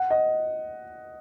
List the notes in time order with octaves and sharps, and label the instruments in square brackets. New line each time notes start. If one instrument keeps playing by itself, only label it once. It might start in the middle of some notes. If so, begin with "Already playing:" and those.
Already playing: [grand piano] F#5
D#5